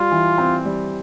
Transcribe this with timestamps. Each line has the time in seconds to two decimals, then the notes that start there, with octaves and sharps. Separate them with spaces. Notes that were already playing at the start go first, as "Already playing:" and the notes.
Already playing: G3 F4
0.11 E3
0.38 C4
0.65 G3